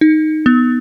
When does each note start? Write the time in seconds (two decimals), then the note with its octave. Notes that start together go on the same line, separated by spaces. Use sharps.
0.01 D#4
0.46 B3